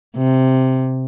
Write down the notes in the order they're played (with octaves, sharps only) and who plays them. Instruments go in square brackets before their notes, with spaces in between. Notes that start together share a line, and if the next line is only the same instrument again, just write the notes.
[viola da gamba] C3